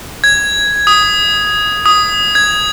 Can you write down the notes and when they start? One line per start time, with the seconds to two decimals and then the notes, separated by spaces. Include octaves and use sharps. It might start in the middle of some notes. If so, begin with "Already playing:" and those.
0.24 G#6
0.87 D#6
1.86 D#6
2.35 G#6